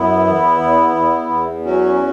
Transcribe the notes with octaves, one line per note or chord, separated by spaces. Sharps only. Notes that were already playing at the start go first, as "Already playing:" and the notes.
Already playing: F#2 B3 E4
E2
E2
E2
E2
F#3 C#4 F#4